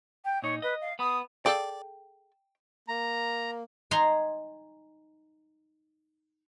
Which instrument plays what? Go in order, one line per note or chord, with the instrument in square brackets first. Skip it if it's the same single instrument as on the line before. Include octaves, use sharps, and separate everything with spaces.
[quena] G5
[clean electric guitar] A#2 D#4 [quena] C#5
[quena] B4 [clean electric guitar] D#5
[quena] F5
[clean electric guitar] B3 B5 [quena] D#6
[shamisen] G#4 A4 F5 [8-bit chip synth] D5 [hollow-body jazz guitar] G5
[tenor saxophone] A#3 [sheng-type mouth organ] A#5
[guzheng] D#4 G#5 A#5 C6